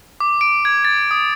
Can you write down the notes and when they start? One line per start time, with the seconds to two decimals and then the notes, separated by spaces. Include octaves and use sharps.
0.20 D6
0.41 D7
0.65 G#6
0.85 A6
1.11 D#6